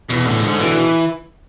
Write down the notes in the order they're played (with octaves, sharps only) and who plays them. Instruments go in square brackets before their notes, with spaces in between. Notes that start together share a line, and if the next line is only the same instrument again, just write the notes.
[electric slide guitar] E2 [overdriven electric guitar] B2
[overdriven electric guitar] A2 [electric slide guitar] D3
[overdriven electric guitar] G#2 [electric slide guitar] D3
[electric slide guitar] B2 [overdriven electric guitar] E3